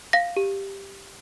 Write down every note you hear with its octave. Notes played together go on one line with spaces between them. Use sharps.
F5 A#6
G4